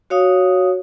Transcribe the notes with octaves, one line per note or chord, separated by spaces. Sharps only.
F#4 C#5 F5 D#6